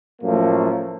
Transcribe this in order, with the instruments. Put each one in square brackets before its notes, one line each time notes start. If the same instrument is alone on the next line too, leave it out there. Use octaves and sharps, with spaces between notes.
[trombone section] F#2 A2 F3 A3 A#3